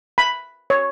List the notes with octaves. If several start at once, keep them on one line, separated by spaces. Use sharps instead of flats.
B5
C#5